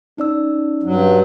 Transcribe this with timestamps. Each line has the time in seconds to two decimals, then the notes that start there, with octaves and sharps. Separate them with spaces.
0.18 C#4 D#4 D5 E6
0.83 G2 F#3